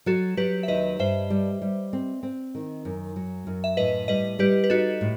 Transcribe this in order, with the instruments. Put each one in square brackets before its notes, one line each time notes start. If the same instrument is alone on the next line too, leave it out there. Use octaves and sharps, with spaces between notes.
[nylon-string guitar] F#3 [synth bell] F#4 A4
[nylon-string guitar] F#3 [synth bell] G4 B4
[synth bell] E5
[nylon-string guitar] D#2 [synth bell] B4 D#5
[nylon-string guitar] G2 [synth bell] C5 E5
[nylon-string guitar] G3
G3
C4
C4
D#3
F#2
F#3
F#2
[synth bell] E5
[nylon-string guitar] A2 [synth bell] B4 D#5
[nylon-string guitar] G3 [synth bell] B4 D#5
[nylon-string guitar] G3 [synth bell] G4 B4
[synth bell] B4
[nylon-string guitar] D#4 [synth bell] F#4 A4
[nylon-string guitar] A2